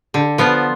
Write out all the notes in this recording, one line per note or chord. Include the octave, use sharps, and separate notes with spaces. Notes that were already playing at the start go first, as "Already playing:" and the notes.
D3
F3 B3 F4